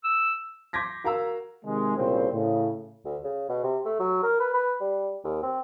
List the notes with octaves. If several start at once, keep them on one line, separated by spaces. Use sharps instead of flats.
E6
C6 D6 G6 G#6 A#6 B6
F#4 A#4 F5 A#5 E6
C3 D#3 G#3
C2 A#2 C#3 C4 C5
A2 C#3
D2
C#3
B2
C3
A3
F#3
A#4
B4
B4
G3
D#2
C4